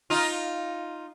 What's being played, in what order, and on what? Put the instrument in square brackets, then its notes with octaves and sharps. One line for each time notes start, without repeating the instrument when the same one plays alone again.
[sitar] D#4 F4